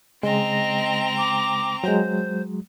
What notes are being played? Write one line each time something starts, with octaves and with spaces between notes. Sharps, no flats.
C#3 G#3 C4 D#5 A#5
D6
F#3 G#3 C5